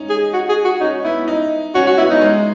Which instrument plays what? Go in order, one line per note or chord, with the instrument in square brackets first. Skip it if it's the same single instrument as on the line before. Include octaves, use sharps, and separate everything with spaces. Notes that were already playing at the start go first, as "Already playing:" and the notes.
Already playing: [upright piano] C#4 D#4
[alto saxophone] G#4
F#4
G#4
F#4
[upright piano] C#4 [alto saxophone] D#4
[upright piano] B3 [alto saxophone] E4
[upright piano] D#4
[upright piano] C#4 [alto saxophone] F#4
[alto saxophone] F#4
[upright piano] B3 [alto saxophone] E4
[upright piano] F#3 [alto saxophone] D#4
[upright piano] G#3